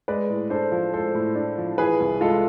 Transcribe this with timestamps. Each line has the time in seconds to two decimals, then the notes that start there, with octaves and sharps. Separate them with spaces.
0.08 G#3 B4 D5
0.30 A2
0.50 D4 A4 C5
0.72 F3
0.93 G#3 A4 C5
1.15 A2
1.35 D4
1.58 F3
1.78 E3 G#4 B4
2.00 C2
2.21 G#3 F4 A4